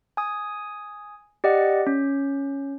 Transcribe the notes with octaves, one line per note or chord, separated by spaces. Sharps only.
G#5 D#6
G4 D5 D#5 F#5
C#4